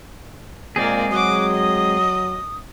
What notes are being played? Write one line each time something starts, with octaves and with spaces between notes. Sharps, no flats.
A#2 G#3 A#3 C4 G#4 D5
F#3 F#4 D6 D#6
D#5